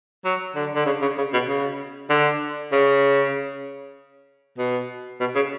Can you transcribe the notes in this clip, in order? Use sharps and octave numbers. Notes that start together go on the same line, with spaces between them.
F#3
D3
D3
C#3
C#3
C#3
B2
C#3
D3
C#3
B2
B2
C#3